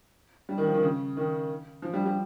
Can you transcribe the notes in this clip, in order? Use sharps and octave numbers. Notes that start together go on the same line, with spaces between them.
G3
D#3
F3
D#3
C#3
D#3
F3
G3
G3